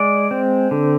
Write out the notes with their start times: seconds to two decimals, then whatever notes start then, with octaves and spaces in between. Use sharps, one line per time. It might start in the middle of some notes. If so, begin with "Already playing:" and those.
Already playing: G#3 D5
0.31 C4
0.71 D3